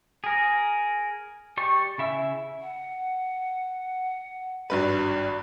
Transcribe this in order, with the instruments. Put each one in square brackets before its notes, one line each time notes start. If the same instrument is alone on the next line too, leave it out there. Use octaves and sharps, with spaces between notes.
[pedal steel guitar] G#4 A#4
G4 D5 C#6
C#3 E4 E5 E6
[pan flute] F#5
[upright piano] G#1 G2 B4 [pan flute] F#4